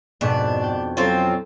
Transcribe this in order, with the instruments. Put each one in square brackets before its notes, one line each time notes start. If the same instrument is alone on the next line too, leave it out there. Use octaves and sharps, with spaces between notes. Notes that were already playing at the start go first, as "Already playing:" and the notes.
[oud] F2 B2 [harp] G#2 [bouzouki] D4
[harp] G5 A5
[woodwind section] F#3 C4 [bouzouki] C#4 F4 C5 [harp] E4 A4